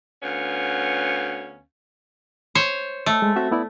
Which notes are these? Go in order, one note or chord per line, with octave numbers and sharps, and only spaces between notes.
D2 B3 C#4 F5
C5 C#5
A3
G#3
C4 F#4 E5
B3 E4 D5